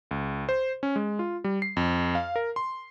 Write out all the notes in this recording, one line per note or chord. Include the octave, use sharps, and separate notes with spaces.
C#2
C5
C#4
G#3
F4
G3
C7
F2
F5
A#4
C6